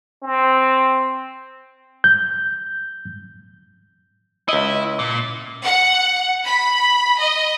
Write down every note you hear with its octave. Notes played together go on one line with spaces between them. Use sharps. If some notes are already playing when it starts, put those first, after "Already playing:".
C4
G6
C#2 E4 D#5
A#2
F#5
B5
D#5